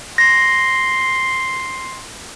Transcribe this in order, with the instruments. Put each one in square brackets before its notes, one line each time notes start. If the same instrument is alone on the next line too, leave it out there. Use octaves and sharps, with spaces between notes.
[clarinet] C6 [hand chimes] A#6